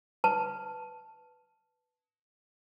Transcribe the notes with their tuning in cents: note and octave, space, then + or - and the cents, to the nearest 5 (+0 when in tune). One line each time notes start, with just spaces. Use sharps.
B4 +0 A5 +0